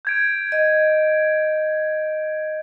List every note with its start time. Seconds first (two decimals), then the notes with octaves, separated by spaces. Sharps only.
0.05 G6 G#6 D7
0.52 D#5